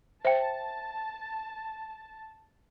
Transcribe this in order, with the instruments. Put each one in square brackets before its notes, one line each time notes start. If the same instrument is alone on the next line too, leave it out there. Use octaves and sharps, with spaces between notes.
[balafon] C5 [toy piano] E5 G5 [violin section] A5